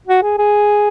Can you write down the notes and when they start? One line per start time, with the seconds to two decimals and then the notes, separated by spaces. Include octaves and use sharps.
0.07 F#4
0.23 G#4
0.38 G#4